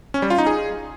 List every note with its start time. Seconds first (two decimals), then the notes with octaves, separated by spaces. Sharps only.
0.14 C#4
0.22 G3
0.30 F4
0.38 D#4
0.47 G#4